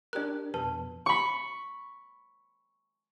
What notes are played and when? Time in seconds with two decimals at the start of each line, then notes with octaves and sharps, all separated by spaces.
0.13 D4 G4 A#4 D5 F#6
0.54 F2 B2 B4 A5
1.06 B5 C#6